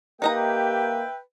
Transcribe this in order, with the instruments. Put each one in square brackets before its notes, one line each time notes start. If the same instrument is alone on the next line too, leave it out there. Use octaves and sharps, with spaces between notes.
[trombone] A#3 [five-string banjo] D#4 D#5 A#5 [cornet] G4 [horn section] B4 E5 G5